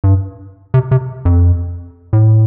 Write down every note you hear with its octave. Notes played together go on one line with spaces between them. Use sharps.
G2
C3
C3
F2
A2